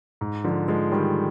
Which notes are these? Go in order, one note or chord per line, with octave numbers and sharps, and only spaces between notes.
G#2
D3 F3
F3 G#3
D#3 G3